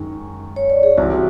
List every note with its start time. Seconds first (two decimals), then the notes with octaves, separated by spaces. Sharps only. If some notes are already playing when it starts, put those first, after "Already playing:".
Already playing: F#2 D#3 G#3
0.56 C#5
0.70 D5
0.83 G#4
0.97 C2 C3 E3 F#4